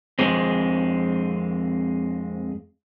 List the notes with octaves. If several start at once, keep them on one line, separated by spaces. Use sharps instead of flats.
F2 G#3 C4